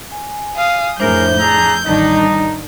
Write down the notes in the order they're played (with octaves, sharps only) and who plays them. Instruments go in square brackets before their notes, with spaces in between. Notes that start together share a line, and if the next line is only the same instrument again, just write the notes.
[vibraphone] G#5
[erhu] F5 [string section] D#6
[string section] F2 A2 [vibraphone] D4 C5 E5 [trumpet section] G#4 A#4 [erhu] G6
[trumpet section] D4 G#4 A#5 [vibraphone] E6
[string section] A1 D#3 D4 [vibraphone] G3 [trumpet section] D#4